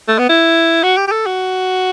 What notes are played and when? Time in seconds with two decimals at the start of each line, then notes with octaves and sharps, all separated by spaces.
0.08 A3
0.19 B3
0.30 E4
0.84 F#4
0.97 G4
1.08 G4
1.12 A4
1.26 F#4